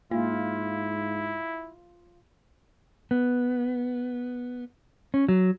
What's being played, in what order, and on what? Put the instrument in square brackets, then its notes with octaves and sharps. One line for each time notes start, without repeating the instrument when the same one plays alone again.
[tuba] G#2 [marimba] A#3 [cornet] E4 [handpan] F4
[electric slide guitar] B3
C#4
F#3